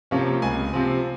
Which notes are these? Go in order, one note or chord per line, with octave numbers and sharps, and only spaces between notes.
C3 F3 A#3 C#4
C#2 G#5
C3 F3 C4